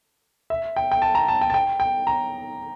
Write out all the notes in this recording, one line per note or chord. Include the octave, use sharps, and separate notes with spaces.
E5
G5
G5
A5
A#5
A5
G5
A5
G5
G5
A#5